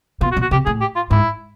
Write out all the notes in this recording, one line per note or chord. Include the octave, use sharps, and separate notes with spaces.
B2 F4
F#4
B2
F#4
C3 G4
A2 G#4
G4
F4
G#2 E4